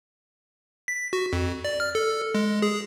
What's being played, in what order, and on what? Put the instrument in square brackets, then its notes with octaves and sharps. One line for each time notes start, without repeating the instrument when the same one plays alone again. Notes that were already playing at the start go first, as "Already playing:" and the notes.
[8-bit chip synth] B6
F#4
F2
D5
F6
A4
G#3
G#4